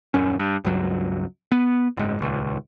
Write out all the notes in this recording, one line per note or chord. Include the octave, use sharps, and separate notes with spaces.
D#1 F#2 C#4
G2
C#2 G2 F#3
B3
F#1 G#2
D#1 C#2